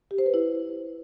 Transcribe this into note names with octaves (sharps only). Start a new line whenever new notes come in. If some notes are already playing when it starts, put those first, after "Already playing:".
G4
C5
B4
E4